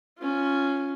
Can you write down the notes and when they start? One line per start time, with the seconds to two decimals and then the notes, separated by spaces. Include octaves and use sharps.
0.18 C#4 F4